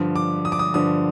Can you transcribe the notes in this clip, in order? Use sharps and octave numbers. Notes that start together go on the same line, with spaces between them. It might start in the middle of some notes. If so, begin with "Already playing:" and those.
Already playing: G2 D3 F3
D6
D#6
D6
D#6
G2 D3 F3 D#6